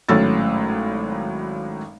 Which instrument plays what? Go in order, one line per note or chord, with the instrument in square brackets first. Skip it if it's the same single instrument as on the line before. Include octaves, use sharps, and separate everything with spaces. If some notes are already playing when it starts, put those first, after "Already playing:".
[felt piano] G#1 A2 F#3 C#4 E6 A6